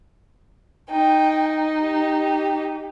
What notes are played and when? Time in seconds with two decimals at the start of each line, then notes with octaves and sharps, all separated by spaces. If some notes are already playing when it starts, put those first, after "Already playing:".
0.91 D#4 G5
1.81 G4